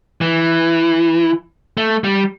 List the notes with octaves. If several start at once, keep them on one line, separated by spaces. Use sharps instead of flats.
E3
A3
G3